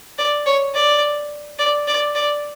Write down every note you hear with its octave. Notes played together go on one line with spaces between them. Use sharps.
D5
C#5
D5
D5
D5
D5